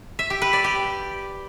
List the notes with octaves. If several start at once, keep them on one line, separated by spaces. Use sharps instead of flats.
E5
G4
B4
D5
G4